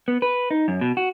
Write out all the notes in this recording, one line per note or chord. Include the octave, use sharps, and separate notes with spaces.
B3
B4
D#4
F#2
B2
F#4